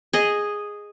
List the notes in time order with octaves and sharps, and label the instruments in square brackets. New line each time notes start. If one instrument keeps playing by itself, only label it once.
[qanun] G#4 D#5